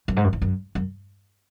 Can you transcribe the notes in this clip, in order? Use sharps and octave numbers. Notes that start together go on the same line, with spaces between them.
F#2
G#2
F#2
E2
F#2
F#2